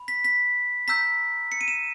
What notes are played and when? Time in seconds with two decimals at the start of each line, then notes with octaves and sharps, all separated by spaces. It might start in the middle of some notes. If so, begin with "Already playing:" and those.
Already playing: B5
0.08 B6
0.24 B6
0.88 A#5 E6 G6 B6
1.52 C#7
1.61 D#7
1.68 E7